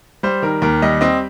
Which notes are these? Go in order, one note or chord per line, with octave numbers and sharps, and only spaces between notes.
G3 C5
D#3 A#4
D#2 A#4
G3 D#5
C4 D#5